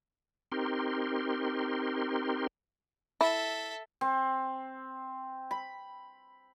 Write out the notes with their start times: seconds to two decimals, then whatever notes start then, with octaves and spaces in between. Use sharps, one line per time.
0.52 C4 D#4 G4 A#4 C6
3.21 E4 A4 E5
4.01 C4
5.51 B5